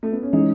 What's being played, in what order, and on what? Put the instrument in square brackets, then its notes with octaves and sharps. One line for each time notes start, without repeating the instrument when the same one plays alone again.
[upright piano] A3
B3
C#4
[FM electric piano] E3 G#3 C#4 [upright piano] D#4